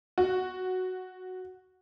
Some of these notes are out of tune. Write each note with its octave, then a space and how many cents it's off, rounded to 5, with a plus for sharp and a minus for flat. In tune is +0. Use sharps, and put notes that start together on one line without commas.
F#4 -5